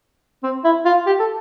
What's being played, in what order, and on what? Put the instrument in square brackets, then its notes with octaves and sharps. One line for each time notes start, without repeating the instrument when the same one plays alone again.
[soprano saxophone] C4
E4
F4
G4
A4